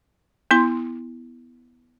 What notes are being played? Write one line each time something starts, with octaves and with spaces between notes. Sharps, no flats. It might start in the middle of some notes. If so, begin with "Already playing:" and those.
B3 E4 C6